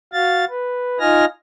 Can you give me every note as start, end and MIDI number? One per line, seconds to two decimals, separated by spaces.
0.13 0.45 66
0.13 0.45 77
0.13 0.45 93
0.50 0.99 71
1.00 1.25 63
1.00 1.25 65
1.00 1.25 75
1.00 1.25 80
1.00 1.25 89
1.00 1.25 94